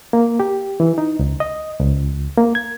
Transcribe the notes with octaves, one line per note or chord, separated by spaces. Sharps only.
A#3
G4
E3
D#4
C#2
D#5
C#2
A#3
G#6